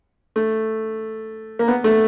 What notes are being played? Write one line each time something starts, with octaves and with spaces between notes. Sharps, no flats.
A3
A#3
B3
A3